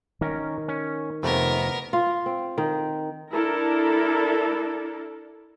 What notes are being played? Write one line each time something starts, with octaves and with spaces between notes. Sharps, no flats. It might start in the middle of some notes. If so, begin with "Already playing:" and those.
D#3 C#4 A#4
C#4
F2 C3 A3 B3 A#4
F4
C4
D#3
D4 E4 A4 A#4